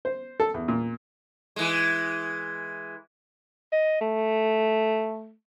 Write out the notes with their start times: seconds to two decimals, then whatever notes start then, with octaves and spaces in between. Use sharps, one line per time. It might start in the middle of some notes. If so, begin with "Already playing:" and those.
0.05 C5
0.40 A4
0.54 E2
0.68 A#2
1.56 E3 G#3
3.72 D#5
4.01 A3